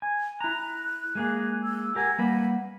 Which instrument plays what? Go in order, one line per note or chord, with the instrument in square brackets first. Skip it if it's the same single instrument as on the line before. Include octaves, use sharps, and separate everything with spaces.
[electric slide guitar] G#5
[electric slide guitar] E4 A#5 [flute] F#6
[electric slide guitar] G#3 A#3 G#4
[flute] E6
[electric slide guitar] G4 A#4 G#5 [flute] F#5
[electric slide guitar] G3 A#3 B4